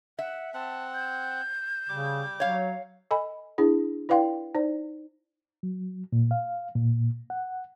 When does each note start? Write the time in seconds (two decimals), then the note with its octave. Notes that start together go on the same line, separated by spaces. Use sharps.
0.19 E5 F#5
0.54 C4 F#5 A5
0.94 G6
1.89 C#3 G3 D6
2.40 F#3 C#5 F5
3.11 A4 D#5 G#5 B5
3.58 D4 E4 G#4
4.09 E4 B4 D5 F5 G5 C6
4.55 D#4 C5 D5
5.63 F#3
6.12 A#2
6.31 F5
6.75 A#2
7.30 F#5